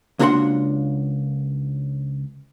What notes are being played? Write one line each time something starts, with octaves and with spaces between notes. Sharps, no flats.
C#2 A#3 D4 F#4 F#5 C6